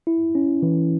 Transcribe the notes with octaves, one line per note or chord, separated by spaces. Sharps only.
E4
C#4
E3